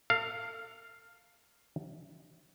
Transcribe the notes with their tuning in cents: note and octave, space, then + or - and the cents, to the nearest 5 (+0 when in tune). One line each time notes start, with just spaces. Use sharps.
A4 +40 F5 +0